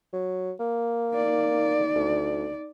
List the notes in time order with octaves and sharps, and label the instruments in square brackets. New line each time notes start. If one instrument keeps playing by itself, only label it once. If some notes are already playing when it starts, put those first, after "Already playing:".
[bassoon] F#3
A#3
[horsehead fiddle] D#4 D5
[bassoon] D2